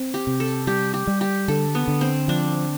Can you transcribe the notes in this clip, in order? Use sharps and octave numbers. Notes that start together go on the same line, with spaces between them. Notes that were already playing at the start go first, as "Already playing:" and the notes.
Already playing: C4
G4
C3
A4
G3 G4
G4
G3
G4
D3 A4
B3
D3
C4
F3 D4